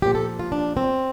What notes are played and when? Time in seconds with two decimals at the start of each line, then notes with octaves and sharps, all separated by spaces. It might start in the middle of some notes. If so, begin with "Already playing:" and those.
0.02 A#2 F3 G4
0.15 A4
0.39 F4
0.52 D4
0.77 C4